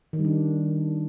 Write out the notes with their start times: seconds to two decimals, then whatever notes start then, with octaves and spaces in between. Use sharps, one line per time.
0.13 D#3
0.19 G3
0.25 D4